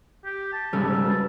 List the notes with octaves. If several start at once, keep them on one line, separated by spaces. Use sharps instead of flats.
G4
A5
G#2 C#3 G3 A4 E6 F6
C5
F#4 B4